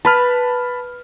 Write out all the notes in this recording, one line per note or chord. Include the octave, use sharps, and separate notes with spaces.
B4 A5 B5 F6